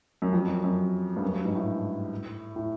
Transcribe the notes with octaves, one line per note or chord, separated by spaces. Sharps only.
F#2
F2
F#2
F#2
G2
F#2
G2
G#2
A2
A2